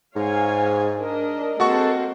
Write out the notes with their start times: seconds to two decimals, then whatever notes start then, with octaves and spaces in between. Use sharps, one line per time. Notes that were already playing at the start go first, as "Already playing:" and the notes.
0.16 G#2 C#5 F5 G#5
0.99 D4 A#4 D#5
1.60 G#3 A#3 C4 F#4 A4 C5 F#5 C#6